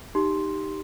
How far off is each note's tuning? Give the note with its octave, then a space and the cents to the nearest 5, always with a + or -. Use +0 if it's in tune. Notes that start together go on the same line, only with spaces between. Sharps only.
D#4 +0 G4 +0 C6 +0